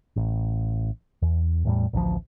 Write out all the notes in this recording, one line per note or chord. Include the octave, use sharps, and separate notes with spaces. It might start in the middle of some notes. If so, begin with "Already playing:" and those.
A1
E2
E2 A2 G3
A1 D2 F3